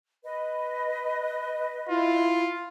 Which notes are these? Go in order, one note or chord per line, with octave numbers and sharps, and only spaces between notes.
B4 D#5
E4 F4